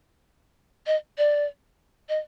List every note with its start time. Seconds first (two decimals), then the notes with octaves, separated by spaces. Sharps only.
0.87 D#5
1.18 D5
2.09 D#5